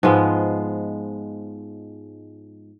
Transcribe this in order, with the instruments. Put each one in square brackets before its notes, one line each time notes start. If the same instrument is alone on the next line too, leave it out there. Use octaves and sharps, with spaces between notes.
[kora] G#2 F3 G#3 B3